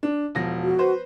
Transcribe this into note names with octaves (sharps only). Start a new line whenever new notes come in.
D4
E1 F3 A#6
F#4
B4 C5